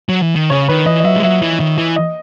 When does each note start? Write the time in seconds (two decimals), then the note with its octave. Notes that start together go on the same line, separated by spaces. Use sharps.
0.09 F#3
0.22 E3
0.36 D#3
0.50 C#3 C#5
0.68 D#3 B4
0.86 E3 D#5
1.00 D#5
1.05 F#3 E5
1.16 G#3
1.22 F#3 E5
1.42 E3
1.60 D#3
1.78 E3
1.96 D#5